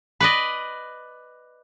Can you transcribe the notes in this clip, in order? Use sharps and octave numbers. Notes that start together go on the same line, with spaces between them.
B4 D5 D#5